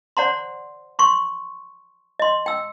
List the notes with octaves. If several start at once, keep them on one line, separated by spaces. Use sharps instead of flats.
C5 D5 F#5 A#5 C6
C6 C#6
D#5 C6
G5 E6